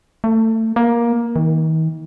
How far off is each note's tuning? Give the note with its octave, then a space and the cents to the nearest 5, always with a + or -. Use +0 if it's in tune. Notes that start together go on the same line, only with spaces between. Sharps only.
A3 +25
A#3 +15
D#3 +40